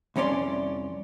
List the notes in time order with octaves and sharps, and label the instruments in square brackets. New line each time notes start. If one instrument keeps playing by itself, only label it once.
[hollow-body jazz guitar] C2 F2 C#4 C#5 D5 C6